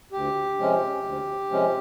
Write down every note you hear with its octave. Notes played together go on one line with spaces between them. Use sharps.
D2 G4
C3 F3 G#3 C#4
D2
C3 F3 G#3 C#4